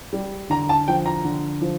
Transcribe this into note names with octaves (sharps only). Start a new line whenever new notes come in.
G3
D3 A#5
A5
F3 G5
A#5
D3
F3